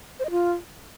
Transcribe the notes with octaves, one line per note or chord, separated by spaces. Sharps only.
C5
D#5
F4